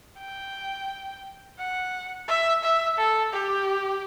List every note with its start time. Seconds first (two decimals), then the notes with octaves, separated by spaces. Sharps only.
0.18 G5
1.58 F#5
2.28 E5
2.63 E5
2.98 A4
3.32 G4